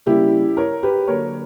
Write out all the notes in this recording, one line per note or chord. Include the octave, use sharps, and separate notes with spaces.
C#3 G3 A#3 E4 G4
A#4 C#5
G4 B4
D3 F#3 A#3 A#4 C#5